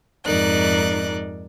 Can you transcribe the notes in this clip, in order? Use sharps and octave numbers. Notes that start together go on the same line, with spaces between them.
F2 G#2 D#4 A#4 D5 F#6